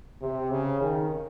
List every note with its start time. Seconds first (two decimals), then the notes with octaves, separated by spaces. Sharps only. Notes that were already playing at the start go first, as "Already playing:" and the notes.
0.21 C3
0.50 C#3
0.81 D#3